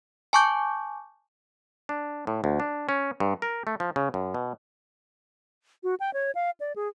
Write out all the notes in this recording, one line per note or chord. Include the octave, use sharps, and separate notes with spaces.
G#5 A5 C#6 D6 G6
D4
A2
D2
D4
C#4
G2
A#4
A3
F3
C#3
F#2
B2
F#4
G5
C#5
F5
D5
G#4